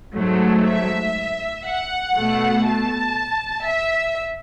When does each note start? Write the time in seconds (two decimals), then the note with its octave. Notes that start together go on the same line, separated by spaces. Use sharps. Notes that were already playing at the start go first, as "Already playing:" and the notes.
0.15 G#2 F#3 A3
0.66 E5
1.66 F#5
2.16 B2 A3
2.66 A5
3.66 E5